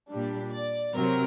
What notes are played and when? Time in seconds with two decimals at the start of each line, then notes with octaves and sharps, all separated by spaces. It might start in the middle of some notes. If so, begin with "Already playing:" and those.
0.10 A#2 G3 D4
0.54 D5
0.95 C3 F#3 C4 A#4